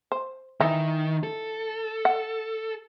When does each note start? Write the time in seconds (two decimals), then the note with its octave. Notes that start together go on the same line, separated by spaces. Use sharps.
0.12 C5
0.60 D#3 E3 D#4
1.23 A4
2.05 F#5